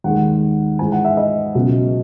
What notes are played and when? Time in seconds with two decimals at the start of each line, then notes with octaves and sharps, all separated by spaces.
0.04 D#2 D#3 G#3 F#5
0.79 G#2 E3 G#3 G#5
0.92 F#5
1.05 E5
1.17 D#5
1.55 C#2 B2 F#3